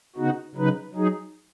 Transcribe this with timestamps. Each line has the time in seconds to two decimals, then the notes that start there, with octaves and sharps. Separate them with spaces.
0.16 C#3 B3 D#4 F#4
0.55 C#3 F#3 D#4 B4
0.94 F#3 D#4 G#4